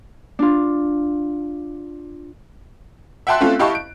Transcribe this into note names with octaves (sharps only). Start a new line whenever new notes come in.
D4 F4
E5 F#5 G5 A5 C6 F#6
A3 C4 C#4 F4 A4
E4 G4 D#5 F5 A5 C#6
D7